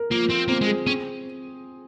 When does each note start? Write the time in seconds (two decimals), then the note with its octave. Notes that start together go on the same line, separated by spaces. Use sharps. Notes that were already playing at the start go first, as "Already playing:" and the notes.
Already playing: A#4
0.11 F3 A#3
0.30 C4 F4
0.48 A#3 C4
0.61 G#3
0.67 G#4
0.86 C4 C#4